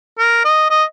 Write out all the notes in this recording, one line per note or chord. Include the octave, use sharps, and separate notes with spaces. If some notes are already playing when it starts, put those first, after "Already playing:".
A#4
D#5
D#5